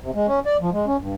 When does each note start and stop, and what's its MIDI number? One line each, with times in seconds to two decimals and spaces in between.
0.01 0.11 48
0.15 0.27 56
0.28 0.40 61
0.45 0.57 74
0.61 0.70 53
0.73 0.86 56
0.87 0.97 61
0.99 1.15 43